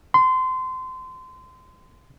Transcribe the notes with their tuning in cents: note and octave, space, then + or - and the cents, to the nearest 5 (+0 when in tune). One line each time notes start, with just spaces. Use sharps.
C6 -25